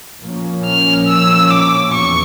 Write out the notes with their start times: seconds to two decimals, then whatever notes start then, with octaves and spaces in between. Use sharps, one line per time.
0.21 A#2 F3 A#3 C#4
0.65 F6
1.08 E6
1.50 D6
1.94 E2 C#6